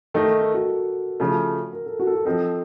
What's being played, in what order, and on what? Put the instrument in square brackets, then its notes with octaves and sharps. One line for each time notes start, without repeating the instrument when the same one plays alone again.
[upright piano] D#3 A3 D#4 [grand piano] A4
[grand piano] A#4
A4
F#4
[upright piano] C#3 F3 A3
[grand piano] A#4
A4
F#4
A4
F#4
[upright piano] F3 C4 D#4 [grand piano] A4